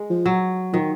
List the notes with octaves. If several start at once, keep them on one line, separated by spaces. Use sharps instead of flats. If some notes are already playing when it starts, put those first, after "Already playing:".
Already playing: G#3
F3
F#3
D#3 F3